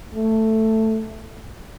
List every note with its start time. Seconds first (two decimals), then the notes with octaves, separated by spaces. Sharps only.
0.14 A3